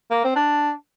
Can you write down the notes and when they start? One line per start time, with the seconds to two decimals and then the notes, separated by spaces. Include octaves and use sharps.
0.11 A#3
0.24 C4
0.36 D4